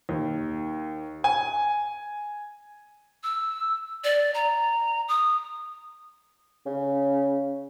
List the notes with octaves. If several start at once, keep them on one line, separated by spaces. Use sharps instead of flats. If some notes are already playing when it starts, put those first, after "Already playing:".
D#2
G#5
E6
D5
A#5
D#6
C#3